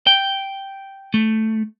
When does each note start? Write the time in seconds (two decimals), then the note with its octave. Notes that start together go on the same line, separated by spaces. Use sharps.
0.07 G5
1.14 A3